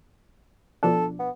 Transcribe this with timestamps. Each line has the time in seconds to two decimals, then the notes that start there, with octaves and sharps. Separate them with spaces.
0.83 B2 F3 D4 A4
1.19 B3